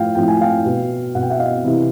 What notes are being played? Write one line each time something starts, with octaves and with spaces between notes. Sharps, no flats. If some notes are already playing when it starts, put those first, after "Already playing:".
Already playing: A2 F3 F5 G5
A2 F3 G5
G#5
F5 G5
B2
B2 F#5
G5
E5 F#5
D#5 F5
C3 E3